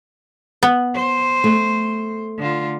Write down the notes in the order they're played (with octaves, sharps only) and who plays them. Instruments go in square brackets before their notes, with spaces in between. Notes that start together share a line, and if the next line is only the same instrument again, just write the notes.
[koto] B3
[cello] C5
[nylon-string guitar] A3
[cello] D3 F4